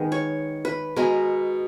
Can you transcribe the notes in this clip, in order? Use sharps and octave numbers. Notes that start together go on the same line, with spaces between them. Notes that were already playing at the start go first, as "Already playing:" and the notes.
Already playing: D#3 G#3 B3
C#5
B4
B2 G#3 B3 A#4